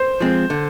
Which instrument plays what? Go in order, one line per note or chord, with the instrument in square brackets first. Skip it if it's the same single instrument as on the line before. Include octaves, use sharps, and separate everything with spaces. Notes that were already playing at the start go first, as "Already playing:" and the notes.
Already playing: [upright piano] C5
[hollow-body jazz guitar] F3 G#3 C4
D3